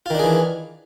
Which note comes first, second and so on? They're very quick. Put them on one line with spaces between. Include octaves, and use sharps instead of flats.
F4 D#3 D4 G#4 E3